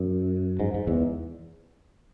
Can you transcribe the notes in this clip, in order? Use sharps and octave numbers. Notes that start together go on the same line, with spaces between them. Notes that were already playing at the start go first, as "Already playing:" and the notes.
Already playing: F#2
G#2
G#2
E2